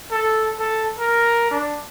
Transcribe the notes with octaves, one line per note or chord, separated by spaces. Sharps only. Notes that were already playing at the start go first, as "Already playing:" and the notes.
A4
A4
A#4
D4